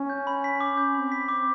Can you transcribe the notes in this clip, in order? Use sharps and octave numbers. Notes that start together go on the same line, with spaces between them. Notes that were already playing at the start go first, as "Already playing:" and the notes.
Already playing: C#4
G6
B5
B6
D6
G6
C4 B5
B6
D6